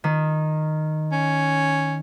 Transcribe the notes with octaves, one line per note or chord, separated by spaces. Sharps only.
D#3
C#4